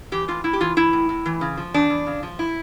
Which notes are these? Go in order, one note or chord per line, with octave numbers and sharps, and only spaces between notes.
E3 G4
A2 F4
A2 E4
G4
E3 F4
E3 E4
A2
A2
E3
C#3
F3
E2 D4
E2
C#3
F3
E4